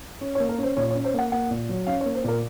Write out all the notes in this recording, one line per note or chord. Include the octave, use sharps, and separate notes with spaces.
C#4
C#5
A#3
A#4
C#4 C5
A#2 C#5
C#5
C#4
C5
A#3 F#5
A#3 F#5
A#2
F#3
C#4 F5
C#5
A#3
C5
A#2 A#4